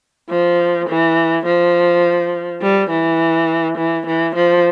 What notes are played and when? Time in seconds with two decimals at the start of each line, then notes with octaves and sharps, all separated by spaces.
0.30 F3
0.89 E3
1.46 F3
2.62 G3
2.90 E3
3.77 E3
4.06 E3
4.36 F3